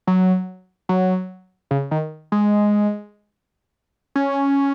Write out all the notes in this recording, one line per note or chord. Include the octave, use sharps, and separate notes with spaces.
F#3
F#3
C#3
D#3
G#3
C#4